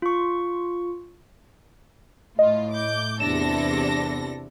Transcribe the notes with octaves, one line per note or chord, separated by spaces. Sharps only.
F4 C#6
A2 F4 D#5
D6 G6
E2 C3 D4 A4 A#6 E7